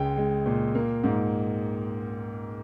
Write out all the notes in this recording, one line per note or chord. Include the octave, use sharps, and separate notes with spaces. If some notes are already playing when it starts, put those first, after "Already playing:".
Already playing: C#2 G#3 G5
G#3
A#2
A#3
G#2